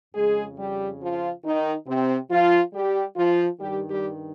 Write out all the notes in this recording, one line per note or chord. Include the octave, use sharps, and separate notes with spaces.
F2 C#3 G#3 G#4
G3 G4
F3 F4
D#3 D#4
C3 C4
F3 F4
G3 G4
F3 F4
G2 D#3 G3 G4
G3 G4